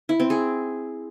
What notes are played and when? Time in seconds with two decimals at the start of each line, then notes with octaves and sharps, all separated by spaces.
0.09 E4
0.20 C4
0.30 G#4